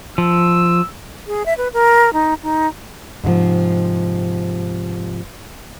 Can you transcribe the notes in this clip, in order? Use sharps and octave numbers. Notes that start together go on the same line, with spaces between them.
F3 E6
G#4
E5
B4
A#4
D#4
D#4
G#2 C3 D#3 F3